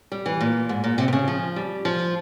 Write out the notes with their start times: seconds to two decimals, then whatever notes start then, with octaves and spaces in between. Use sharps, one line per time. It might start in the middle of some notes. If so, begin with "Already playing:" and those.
0.12 G3
0.26 E3
0.41 A#2
0.69 G#2
0.84 A#2
0.98 C3
1.08 C3
1.13 C#3
1.28 F3
1.56 G3
1.85 F3